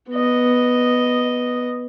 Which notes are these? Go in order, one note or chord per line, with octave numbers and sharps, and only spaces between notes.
B3 D#5